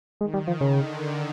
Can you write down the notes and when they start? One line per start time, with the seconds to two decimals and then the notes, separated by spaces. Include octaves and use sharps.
0.21 D#3 G#3
0.34 G3
0.47 F3
0.61 C#3
0.73 D3